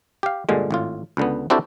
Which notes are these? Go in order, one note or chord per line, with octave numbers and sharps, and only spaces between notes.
G4 F5
G2 A#2 D3 G#3
G#1 A2 F4
C#2 D3 B3
C4 D4 E4 F#4 G4 A4